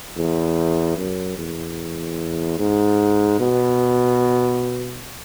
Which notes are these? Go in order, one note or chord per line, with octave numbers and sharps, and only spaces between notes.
E2
F#2
E2
G#2
B2